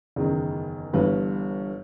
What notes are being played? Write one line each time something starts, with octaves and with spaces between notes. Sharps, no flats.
F#1 E2 D#3
G1 G2 E3 B4